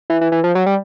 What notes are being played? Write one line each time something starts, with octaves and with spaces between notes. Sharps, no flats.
E3
E3
E3
F3
F#3
G3